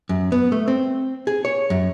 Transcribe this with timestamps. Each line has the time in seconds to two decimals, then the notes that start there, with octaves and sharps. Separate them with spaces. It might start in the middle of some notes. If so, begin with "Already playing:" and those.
0.09 F#2
0.32 B3
0.52 A3
0.68 C4
1.27 G#4
1.45 C#5
1.70 F#2